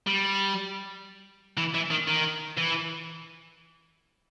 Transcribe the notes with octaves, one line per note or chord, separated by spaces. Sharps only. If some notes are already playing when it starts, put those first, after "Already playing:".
G3
E3
E3
D#3
D#3
E3